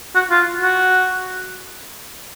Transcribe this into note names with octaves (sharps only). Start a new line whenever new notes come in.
F#4
F4
F#4